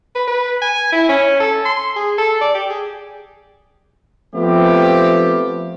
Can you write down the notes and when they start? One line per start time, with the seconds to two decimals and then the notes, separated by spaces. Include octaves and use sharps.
0.15 B4
0.27 B4
0.62 G#5
0.93 E4
1.09 C#4
1.40 A4
1.65 C6
1.96 G#4
2.18 A4
2.41 D5
2.55 G4
2.70 G#4
4.35 F3 A3 B3 C4 F4 G4